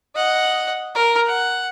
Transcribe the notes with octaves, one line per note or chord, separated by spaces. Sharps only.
D#5 F#5
A#4
F#5